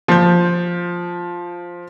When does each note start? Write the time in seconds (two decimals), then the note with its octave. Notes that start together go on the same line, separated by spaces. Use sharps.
0.08 F3 G6